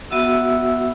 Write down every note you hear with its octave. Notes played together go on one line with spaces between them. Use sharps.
B3 F#4 E5 F#5 E6